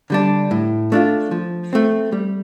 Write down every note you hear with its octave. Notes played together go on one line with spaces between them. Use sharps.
D3 G3 D4
A2
A3 D4 F4
F3
A3 C4
G3